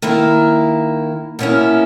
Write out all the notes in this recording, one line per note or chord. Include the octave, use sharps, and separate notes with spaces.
D#3 A#3 E4
B2 A#3 C#4 E4